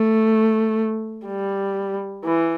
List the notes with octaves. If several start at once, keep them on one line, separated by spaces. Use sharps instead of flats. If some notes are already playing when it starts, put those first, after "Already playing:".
Already playing: A3
G3
E3